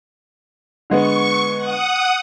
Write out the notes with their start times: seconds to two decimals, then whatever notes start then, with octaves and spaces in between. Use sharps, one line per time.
0.90 D3 G#3 B3 C#6
1.57 F#5 D#6